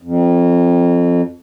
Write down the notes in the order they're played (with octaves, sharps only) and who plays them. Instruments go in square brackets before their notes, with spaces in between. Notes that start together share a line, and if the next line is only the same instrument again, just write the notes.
[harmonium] F2